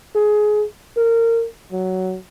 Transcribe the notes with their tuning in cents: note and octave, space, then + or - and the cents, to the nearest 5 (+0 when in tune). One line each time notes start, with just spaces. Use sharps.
G#4 +20
A#4 -20
F#3 +10